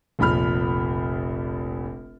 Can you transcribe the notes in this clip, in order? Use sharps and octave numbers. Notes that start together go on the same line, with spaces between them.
F1 A#1 F3 B5 F6